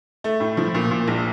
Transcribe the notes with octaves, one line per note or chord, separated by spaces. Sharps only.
A3
A2
F3
A#2
A#2
A#1